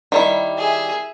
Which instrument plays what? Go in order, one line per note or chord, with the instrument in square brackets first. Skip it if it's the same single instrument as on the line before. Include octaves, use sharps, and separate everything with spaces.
[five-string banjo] D#3 G3 E4
[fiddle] G#4 E5